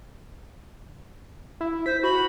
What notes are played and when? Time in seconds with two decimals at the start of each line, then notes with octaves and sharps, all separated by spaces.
1.61 E4
1.86 C5 B6
2.03 F#4 B5